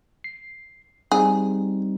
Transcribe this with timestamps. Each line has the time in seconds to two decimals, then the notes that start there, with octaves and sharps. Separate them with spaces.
0.24 C7
1.11 G3 C4 D#4 G#4